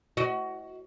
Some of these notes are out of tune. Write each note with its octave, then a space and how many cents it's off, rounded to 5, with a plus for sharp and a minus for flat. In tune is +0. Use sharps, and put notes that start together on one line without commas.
F#4 +20 D#5 +35